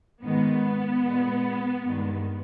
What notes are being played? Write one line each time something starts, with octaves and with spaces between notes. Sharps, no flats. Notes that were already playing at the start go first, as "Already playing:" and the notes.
G#2 D#3 G#3 B3
A#2 G#3
G2 D#3 G#3